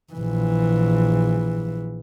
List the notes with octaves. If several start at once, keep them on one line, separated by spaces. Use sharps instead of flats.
A#1 E3